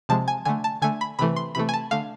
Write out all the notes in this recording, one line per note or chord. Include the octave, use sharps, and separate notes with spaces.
C3 F3 G#3 A5
G#5
D3 A3 G#5
A5
D3 A3 G#5
B5
C3 E3 A3 B5
C6
C3 E3 A3 B5
G#5
A5
D3 A3 F5